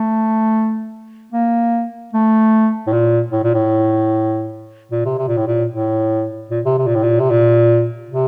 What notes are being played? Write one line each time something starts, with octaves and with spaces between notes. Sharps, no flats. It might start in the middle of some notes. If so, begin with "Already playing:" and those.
Already playing: A3
A#3
A3
A2
A#2
A2
A#2
A2
A#2
C3
C3
A#2
A2
A#2
A2
A#2
C3
C3
A#2
A2
A#2
C3
A#2
C3